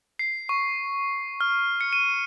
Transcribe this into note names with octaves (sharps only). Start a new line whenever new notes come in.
C7
C#6
F6
C#7
D#7